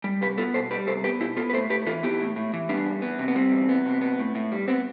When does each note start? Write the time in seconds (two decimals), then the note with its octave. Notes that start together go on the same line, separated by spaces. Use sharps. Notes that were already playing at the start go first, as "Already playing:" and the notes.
0.04 G3
0.21 C2 G4 B4
0.38 B3 F4 A4
0.54 B2 A4 C5
0.71 G3 G4 B4
0.87 C2 A4 C5
1.04 B3 G4 B4
1.20 B2 E4 G4
1.36 B3 F4 A4
1.50 B4
1.53 A2 A4 C5
1.70 A2 G4 B4
1.87 E3 F4 A4
2.03 B3 E4 G4
2.20 A2
2.36 A2
2.54 E3
2.69 G3 B3 D4
2.86 E2
3.02 B3
3.19 C3
3.28 B3
3.35 G3 C4
3.52 E2
3.69 B3
3.86 C3
4.01 B3
4.19 A2
4.35 A2
4.52 G3
4.68 B3 C4